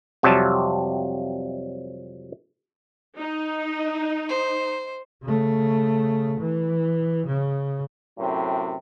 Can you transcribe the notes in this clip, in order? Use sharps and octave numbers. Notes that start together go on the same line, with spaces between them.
F2 C3 F#3 G3 E5 A5
D#4
C5
C#3 A3
E3
C#3
F#2 A2 C3